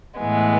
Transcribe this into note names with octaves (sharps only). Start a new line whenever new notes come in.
A2 E3 G#3 B3